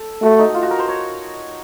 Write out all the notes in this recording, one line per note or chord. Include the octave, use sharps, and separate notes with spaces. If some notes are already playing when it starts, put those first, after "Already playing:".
Already playing: A4
A3 F#4
D#4
F4
F#4
A#4
C5
C#5